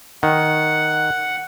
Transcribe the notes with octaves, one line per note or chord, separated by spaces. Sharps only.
D#3 F#5